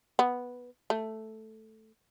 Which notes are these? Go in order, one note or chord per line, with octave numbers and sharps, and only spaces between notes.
B3
A3